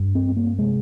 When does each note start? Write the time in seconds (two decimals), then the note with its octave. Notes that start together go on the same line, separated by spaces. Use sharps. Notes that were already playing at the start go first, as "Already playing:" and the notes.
Already playing: G2
0.15 C4
0.37 A#3
0.59 C3 G#3